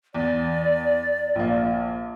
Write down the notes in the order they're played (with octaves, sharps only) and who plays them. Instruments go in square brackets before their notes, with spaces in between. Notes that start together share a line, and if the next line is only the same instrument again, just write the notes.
[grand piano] E2 [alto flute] D5
[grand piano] A#1 A#3